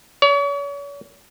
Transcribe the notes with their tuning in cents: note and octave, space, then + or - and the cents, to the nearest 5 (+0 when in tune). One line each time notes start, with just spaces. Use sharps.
C#5 +40